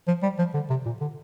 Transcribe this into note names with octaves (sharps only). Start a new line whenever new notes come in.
F3
G3
F3
D3
C3
A#2
D3